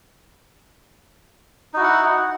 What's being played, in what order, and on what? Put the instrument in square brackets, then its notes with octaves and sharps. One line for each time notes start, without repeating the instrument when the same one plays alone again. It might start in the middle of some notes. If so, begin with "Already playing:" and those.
[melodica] D#4
F#4
E4
F#5